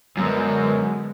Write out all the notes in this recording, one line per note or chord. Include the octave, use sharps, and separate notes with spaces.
F#2 D3 G#3 B3